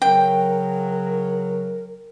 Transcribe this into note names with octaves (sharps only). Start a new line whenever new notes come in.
C#3 F#3 A#4 G5